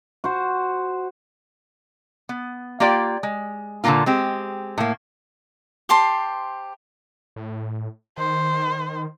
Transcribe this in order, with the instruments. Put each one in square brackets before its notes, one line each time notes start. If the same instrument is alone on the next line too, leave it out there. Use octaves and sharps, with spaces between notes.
[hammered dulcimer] F#4 C5
[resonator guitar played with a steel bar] B3
A#3 F4 G4 D5 G5
G#3
A#2 D3 E3 G#3 A#3 F4
G#3 C4 G4
A2 A#3
[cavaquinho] G4 C5 A5 C6
[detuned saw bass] A2
[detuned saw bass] D#3 [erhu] C5